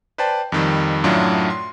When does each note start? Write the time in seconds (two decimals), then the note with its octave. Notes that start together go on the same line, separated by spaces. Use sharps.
0.18 B4 C5 D5 G5 A5
0.52 F2 D#3 G3
1.04 F#2 A2 F#3 D4 E4 F4
1.50 C6